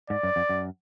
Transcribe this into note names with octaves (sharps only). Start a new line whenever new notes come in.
G#2 D5
F#2
F2
F#2